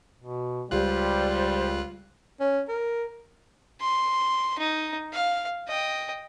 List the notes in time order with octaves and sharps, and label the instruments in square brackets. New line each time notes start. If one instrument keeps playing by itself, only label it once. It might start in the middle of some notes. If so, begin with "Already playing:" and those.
[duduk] B2
[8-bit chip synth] C#2 F4 F#6 [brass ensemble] G3 [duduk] C5
[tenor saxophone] C#4
A#4
[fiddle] C6
D#4
F5
D#5 G5